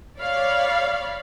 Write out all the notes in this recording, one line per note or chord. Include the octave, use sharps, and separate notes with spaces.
C#5 D5 F5 B5